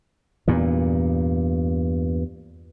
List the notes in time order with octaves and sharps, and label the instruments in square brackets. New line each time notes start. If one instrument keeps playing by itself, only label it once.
[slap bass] E2 G2 A#2